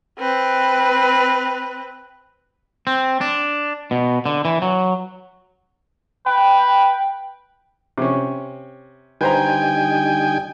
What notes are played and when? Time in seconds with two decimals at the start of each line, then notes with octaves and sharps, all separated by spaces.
0.19 C4 B4
2.87 C4
3.21 D4
3.91 B2
4.26 D3
4.45 E3
4.62 F#3
6.26 B4 G5
7.98 C3 C#4
9.21 D3 G3 D#4 B4 C5 G5 G#5 A#5